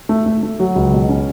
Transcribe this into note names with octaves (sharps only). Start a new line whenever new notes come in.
A3
A3
A3
F#3
C#2
B2
C#4